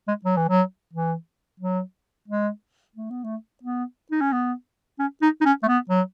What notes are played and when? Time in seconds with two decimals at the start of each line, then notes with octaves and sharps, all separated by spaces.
0.08 G#3
0.25 F#3
0.37 E3
0.49 F#3
0.93 E3
1.60 F#3
2.28 G#3
2.96 A3
3.10 B3
3.24 A3
3.64 B3
4.12 D#4
4.21 C#4
4.32 B3
4.99 C#4
5.22 D#4
5.41 D#4
5.45 C#4
5.63 A3
5.68 B3
5.90 F#3